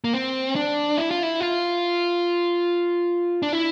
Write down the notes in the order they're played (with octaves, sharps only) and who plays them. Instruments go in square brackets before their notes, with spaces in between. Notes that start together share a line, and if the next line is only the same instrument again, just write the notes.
[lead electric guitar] A#3
C4
D4
E4
F4
E4
F4
D4
E4